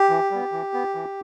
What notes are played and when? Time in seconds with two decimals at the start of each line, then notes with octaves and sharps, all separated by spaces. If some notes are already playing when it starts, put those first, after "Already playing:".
Already playing: G4
0.09 E3
0.31 G3 B3
0.52 E3
0.74 B3
0.95 E3